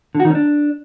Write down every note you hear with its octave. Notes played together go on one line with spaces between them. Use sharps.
D3
F#4
D#3
C#4
D4